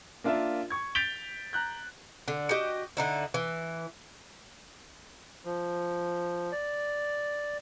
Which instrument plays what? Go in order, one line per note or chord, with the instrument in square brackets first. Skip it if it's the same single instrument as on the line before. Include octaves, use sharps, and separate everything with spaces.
[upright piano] A#3 D4 F4 A#4 E5
C#6 G#6
G6 A6 B6 D7 F7 G7
A#5 F#6 G6
[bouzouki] D3
F#4 G4 D#5
D3 D#4 E4
E3
[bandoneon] F3
D5